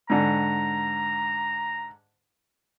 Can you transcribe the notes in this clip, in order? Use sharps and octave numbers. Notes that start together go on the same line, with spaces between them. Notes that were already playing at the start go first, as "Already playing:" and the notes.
G#2 D3 A#5